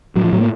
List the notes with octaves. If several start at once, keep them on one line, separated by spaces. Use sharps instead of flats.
A2 F#3
F3
A2 F#3
A#3